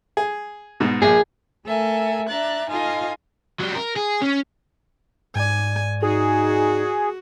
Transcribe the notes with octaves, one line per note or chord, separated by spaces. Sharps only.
G#4
G#2 B2
A#1 G#4
A3 A4 A#4 E5 G#5
D4 E5 A#5 F#6 A6
D#4 F4 A4 D#5 F5 G#5
F#3 G3
A#4
G#4
C#4
G#2 D5 G#5
D#4 F#4 G#4